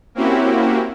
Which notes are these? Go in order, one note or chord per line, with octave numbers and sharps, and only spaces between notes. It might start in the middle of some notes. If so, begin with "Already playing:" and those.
A#3 C4 C#4 E4 F#4 G4